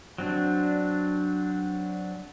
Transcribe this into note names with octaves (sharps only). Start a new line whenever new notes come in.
F#3 C4 D4